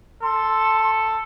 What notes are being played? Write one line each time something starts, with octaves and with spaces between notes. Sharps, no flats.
A4 C6